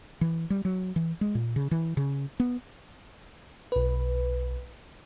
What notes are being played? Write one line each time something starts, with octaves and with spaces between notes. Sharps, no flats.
E3
G3
F#3
E3
G#3
A#2
C#3
E3
C#3
B3
B1 B4